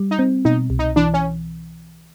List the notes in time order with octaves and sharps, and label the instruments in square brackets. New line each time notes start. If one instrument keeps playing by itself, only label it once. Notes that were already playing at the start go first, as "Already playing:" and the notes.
Already playing: [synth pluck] G3
[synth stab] D#4
[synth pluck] C4
[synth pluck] B2 [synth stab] D#4
[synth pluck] C2
[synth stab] D#4
[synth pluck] E3 [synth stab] D4
[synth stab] C#4